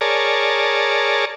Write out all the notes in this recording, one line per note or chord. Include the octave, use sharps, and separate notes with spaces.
G#4 A#4 C#5 D5 A5